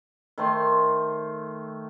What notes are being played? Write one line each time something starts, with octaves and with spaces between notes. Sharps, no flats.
D#3 A3 C5 C6